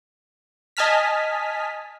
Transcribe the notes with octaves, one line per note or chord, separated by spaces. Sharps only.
D#5 G#5 A5 F6 B6